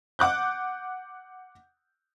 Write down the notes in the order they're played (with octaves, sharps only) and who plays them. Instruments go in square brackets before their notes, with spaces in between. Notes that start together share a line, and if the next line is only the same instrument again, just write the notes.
[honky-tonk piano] F#5 D6 F#6 G6